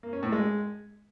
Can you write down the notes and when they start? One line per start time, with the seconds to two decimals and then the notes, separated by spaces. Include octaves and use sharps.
0.03 A#3
0.13 C#4
0.23 A2
0.32 G#3